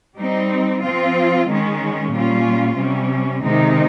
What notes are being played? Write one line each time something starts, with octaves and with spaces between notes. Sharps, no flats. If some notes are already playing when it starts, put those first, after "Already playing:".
G3 C4 D#4
F3 C4 F4
D#3 G#3 C#4
A#2 G3 C#4 F4
C3 G3 C#4
C3 D#3 G#3 D#4